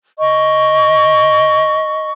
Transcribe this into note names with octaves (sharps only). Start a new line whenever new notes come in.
D#5 C#6